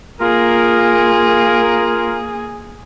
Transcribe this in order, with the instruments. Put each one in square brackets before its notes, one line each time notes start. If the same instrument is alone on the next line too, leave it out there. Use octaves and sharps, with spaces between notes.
[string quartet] A#3 G#4 [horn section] F4 A#4